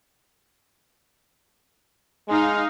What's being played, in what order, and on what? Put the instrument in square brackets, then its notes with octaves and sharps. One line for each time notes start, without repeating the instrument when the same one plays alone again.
[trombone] G#3 [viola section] D#4 F5